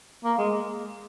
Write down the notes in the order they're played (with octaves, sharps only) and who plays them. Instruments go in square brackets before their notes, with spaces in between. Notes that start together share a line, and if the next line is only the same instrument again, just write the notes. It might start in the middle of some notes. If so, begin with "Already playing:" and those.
[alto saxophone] A#3
G#3